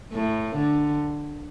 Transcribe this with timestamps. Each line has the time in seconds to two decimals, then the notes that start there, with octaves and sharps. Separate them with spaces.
0.13 A2
0.56 D3